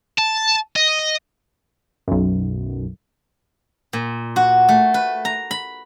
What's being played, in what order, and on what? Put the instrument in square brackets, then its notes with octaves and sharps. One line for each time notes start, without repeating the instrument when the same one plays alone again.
[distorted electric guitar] A5
D#5
[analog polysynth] B1 F#2
[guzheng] A#2
F#4
A3
B4
A#5
B5